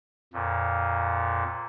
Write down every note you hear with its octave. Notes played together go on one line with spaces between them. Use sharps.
F2 A#2